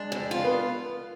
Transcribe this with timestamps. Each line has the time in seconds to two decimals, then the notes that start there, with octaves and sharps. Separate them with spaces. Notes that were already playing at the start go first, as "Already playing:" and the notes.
Already playing: G#3 D4
0.12 F2
0.31 F4
0.44 B3